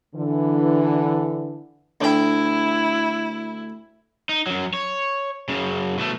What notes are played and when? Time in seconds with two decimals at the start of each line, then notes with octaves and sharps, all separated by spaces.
0.15 D3 E3
2.01 D2 E4 G5
4.29 D#4
4.47 F#2 F#3
4.74 C#5
5.49 F#2 C#3
5.98 B2 A3